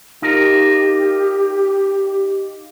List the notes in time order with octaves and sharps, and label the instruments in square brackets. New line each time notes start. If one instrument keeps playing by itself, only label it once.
[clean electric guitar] D#4 F4 A#4 [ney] G4